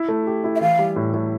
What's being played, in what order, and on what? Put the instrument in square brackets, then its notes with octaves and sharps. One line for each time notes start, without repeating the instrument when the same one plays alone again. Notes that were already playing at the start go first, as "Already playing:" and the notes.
Already playing: [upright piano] E4
A3
G4
E4
[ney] E5
[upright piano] E3 [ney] F5
[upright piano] G3
A2
A2